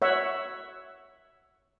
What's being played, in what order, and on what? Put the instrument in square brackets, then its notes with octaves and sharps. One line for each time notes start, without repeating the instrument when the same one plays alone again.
[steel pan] C#5 E5 F#5